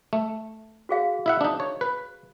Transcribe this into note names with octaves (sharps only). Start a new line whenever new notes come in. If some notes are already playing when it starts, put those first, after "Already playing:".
A3
F#4 G#4 F5
E4 E5 F#5
D4 D#4
C#5
B4